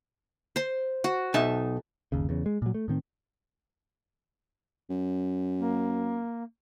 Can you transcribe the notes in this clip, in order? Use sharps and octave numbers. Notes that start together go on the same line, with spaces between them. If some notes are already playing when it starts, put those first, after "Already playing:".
C5 C6
F#4
B1 D#4 E5 A5
G1 D#2 C#3
E2 C#3
G#3
A#2 F#3
A3
A2 D#3 C4
F#2
A#3